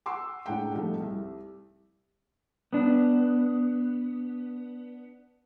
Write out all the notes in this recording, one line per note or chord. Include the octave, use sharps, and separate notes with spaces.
F#5 C6 D6 E6
C#2 A2 D4 F#5 G5
G#2 C3 F3 G3 A3
C2
B3 D4